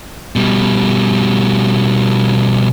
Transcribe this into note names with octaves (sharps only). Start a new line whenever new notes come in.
B2 G3